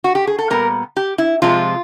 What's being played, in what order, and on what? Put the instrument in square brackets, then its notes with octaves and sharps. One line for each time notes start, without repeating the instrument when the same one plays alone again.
[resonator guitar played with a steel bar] F#4
G4
G#4
A4
A#2 G3 B3 A#4
G4
E4
C3 F3 G#3 F4